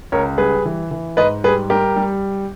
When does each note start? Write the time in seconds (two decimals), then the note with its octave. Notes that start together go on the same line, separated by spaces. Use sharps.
0.12 C#2 A#4 C#5
0.38 G3 G#4 B4
0.65 E3
0.91 E3
1.17 G#2 B4 D#5
1.44 G3 G#4 B4
1.70 G3 G4 A#4
1.96 G3